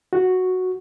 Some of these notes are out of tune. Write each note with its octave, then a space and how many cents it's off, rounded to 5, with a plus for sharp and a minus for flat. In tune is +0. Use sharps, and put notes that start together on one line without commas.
F#4 -5